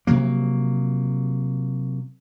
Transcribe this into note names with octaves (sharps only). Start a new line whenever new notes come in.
C3 F3 F#3 A#3